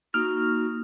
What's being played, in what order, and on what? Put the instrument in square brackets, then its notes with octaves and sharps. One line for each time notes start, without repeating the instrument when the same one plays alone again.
[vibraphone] A#3 D#4 [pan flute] F#4 [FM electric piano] F6